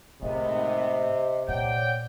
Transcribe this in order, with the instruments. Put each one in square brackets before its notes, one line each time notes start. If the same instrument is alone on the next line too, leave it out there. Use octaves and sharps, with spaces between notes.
[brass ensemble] G#1 B3 [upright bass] A2 [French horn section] C3 [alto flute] D#5
[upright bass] A#2 [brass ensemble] C#5 D5 G5 [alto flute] F#5